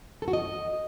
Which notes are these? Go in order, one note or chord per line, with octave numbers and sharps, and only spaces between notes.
A4
F#4
D#5